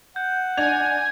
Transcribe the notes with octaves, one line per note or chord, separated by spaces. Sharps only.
F#5 G6
D4 G#5 G#6 F7